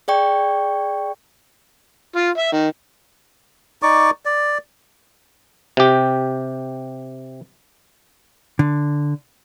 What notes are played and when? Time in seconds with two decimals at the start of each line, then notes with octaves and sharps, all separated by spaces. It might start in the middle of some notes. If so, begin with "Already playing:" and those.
0.08 G#4 D5 G5 C#6
2.16 F4
2.38 E5
2.53 D#3
3.83 D#4 D5 C#6 D6
4.26 D5
5.77 C3 G4
8.59 D3